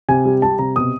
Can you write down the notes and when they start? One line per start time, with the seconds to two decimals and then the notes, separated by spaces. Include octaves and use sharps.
0.09 C3 G#5
0.25 G3
0.42 G3 A5
0.59 C3 A#5
0.76 B2 D#6